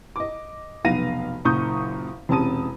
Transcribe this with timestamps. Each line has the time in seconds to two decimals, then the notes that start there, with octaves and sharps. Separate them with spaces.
0.16 D#5 D6
0.84 F1 B1 B3 F5 A#6 D#7
1.45 F#1 F#2 A#2 C#6 D#6 G6
2.29 E1 C3 C#4 A5 D#6 D#7